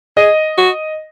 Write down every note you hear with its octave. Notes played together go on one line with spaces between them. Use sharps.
G#4 D#5
F#4